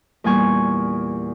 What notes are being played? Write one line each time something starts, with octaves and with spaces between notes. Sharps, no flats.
E2 A#2 G3 G#5 C#6